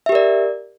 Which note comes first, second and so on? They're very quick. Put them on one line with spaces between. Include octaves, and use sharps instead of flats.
E5 G4 A#4 D5